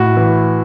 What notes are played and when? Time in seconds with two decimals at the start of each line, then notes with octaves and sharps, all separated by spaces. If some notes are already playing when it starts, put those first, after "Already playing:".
Already playing: A2 F#4
0.17 E3